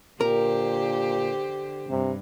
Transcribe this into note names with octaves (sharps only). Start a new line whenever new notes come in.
A#2 D3 G4 A#4 C5
G2 C3